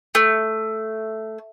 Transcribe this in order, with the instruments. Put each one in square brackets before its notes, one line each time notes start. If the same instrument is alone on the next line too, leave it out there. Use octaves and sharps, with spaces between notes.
[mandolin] A3